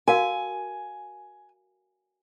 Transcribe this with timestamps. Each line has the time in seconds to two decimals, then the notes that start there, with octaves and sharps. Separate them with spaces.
0.08 F#4 A#4 F5 G#5